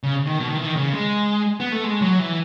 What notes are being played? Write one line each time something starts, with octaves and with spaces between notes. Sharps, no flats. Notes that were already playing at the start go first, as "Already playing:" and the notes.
C#3
D#3
B2
D#3
E3
D#3
C#3
G#3
B3
A3
G#3
F#3
E3